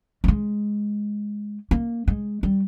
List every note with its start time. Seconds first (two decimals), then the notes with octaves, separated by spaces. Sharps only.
0.24 A3
0.28 G#3
1.71 A#3
2.08 G#3
2.43 G3